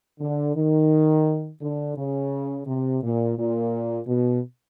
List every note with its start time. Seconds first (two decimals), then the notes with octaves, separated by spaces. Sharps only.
0.20 D3
0.56 D#3
1.61 D3
1.97 C#3
2.67 C3
3.02 A#2
3.37 A#2
4.07 B2